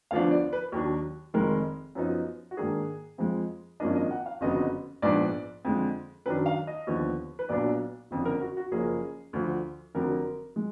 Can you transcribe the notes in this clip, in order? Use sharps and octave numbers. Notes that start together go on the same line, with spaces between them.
D2 D3 F3 B3 D4 F5
D5
B4
D#2 D#3 F#3 D4
F1 F2 D#3 G#3 A#4
F#2 F3 B3 D#4
F#4
G#2 D#3 A#3 D4 G#4
F2 F3 G#3
G#1 F#2 F3 A#3 D4 D#5
D#5
F#5
F5
F#1 F2 D3 F#3 B3 D#5
A#1 G#2 F3 B3 D4 D5
F2 D3 G#3
F#2 D#3 F#3 D4 B4
F5
D#5
D#2 D3 F3 B3
B4
B1 A#2 F#3 B3 D4 D5
F#1 F2 D3
A#4
F#4
F#4
F#1 F#2 F3 A#3 G#4
D2 D3 F3
F1 F2 D3 F#3 A#4
G#3